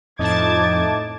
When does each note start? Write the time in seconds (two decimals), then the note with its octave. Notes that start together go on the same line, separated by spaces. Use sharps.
0.19 F2 A2 D#4 A5 D6 G#6 A6